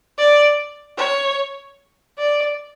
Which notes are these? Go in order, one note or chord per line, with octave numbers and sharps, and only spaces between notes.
D5
C#5
D5